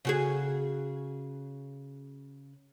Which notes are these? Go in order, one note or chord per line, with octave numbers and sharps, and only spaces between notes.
C#3 F#4 G#4